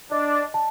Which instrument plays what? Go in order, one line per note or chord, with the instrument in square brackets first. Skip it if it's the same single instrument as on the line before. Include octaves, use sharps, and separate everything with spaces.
[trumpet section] D4 [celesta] D#5
[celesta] A5